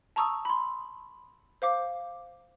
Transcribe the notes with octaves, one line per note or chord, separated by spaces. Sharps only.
A5 A#5 C#6 D#6 E6
B5 C6
C5 F5 D6